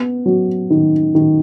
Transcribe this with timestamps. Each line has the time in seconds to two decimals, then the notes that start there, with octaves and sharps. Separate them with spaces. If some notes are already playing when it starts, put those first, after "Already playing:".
Already playing: B3
0.26 F#3
0.70 D#3
1.15 D#3